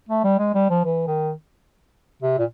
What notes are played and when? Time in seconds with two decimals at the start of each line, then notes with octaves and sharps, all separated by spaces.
0.09 A3
0.24 G3
0.39 G#3
0.54 G3
0.70 F3
0.85 E3
1.07 D#3
2.22 C3
2.39 A#2